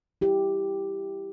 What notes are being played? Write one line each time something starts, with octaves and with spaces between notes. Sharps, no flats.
E4 G4